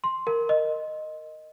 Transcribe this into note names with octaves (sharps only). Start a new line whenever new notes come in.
C6
A#4
D#5